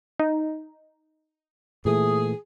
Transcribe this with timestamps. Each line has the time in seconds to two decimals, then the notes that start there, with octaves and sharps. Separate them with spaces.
0.20 D#4
1.85 A#2 E3 A3 G#4